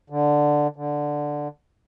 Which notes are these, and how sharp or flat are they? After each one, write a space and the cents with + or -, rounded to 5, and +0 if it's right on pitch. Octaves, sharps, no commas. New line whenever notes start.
D3 +5
D3 +0